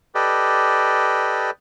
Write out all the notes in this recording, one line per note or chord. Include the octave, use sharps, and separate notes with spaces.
G4 A4 B4 D5 D#5